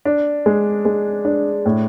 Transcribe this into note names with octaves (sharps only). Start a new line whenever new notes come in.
D4
G#3
G#3
D4
A2